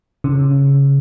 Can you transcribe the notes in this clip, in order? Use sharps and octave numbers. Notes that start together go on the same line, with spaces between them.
C#3